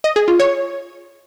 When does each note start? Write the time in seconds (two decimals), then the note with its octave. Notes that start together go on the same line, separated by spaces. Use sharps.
0.04 D#5
0.16 G#4
0.28 F4
0.39 C#5